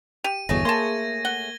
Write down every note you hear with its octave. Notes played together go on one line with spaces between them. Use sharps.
G4 D#7
G1 E2 B2 A3 G#4 C#5 A#6
A#3 A5 C6 G#6 A#6
F#5 G7